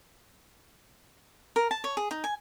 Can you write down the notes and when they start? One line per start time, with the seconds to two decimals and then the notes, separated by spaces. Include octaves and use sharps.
1.56 A#4
1.71 A5
1.84 C#5
1.97 G#4
2.11 D#4
2.24 G#5